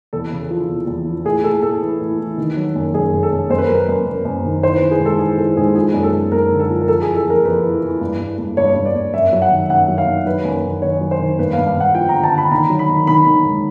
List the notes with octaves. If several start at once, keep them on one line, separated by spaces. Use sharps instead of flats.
E2 A4
C#3
F3
E2
E2
F3
A2 G#4
A2 A4
A2 A4
E3
A2
E3
D#3
F#3
F#2
F#2 G#4
F#2
A4
F#2
F#2 C5
B4
A#4
F#3 B4
F#2
F#2
F#2
D#3
E3 C5
B4
E3
G#4
G#2
A4
E3 G#4
E3 A4
G#2 G#4
F3 G#4
F#2
A4
F#2
F#2 A#4
D3
A4
F3
A#4
F2 A4
E3 G#4
A4
F2 A#4
F2 B4
E3
E3
G2
E3
G2
G2 C#5
G2
D5
G2
F#2 E5
F#3
F#5
D#3
F#2 F#5
F#3
F5
D#3
F#3 B4
F#2
D#3
D#3 C#5
F#3
C5
D#3
G2 B4
F5
G2
F5
G2 F#5
F3 G5
A#5
D3
A5
D3
B5
D#3 A#5
F#3
B5
D#3
D#3 B5
D#3
G#2